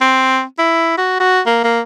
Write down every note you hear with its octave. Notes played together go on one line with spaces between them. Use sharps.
C4
E4
F#4
F#4
A#3
A#3